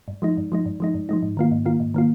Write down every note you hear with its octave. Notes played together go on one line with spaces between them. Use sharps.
G2
F3 G#3 D#4
G2
F3 G#3 D#4
G2
F3 G#3 D#4
G2
F3 G#3 D#4
G#2
D#3 A#3 F4
G#2
D#3 A#3 F4
G#2
D#3 A#3 F4